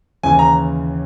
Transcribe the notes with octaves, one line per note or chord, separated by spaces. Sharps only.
D#2 C#3 E3 G#5
A#5